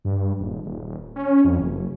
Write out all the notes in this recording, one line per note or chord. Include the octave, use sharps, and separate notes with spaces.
G2
D#1
D#1
C#4
F2
F#1